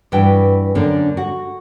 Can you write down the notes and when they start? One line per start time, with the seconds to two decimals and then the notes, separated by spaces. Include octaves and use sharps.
0.12 G2 E3 F#4 B4 G5
0.75 F#2 D3 A#3 D4
1.17 F#4